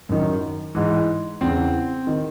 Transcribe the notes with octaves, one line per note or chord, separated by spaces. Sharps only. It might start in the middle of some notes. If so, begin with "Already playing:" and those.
F#2 D#3
G#2 E3
E2 C#3 E3 C4
D#3